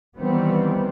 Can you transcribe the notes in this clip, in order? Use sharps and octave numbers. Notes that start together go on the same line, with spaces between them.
D#3 E3 G3 B3 C4